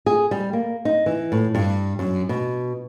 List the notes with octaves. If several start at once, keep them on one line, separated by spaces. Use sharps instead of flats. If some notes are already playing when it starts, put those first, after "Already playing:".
G#4
G3
A#3
D#4
E3
A2
G2
F#2
B2